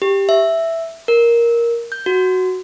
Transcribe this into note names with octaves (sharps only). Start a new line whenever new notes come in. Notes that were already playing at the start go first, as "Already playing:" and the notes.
G4
E5
A#4
G6
F#4